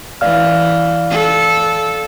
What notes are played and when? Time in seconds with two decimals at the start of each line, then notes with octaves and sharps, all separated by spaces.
0.21 E3 D5 F5 F6
1.10 A4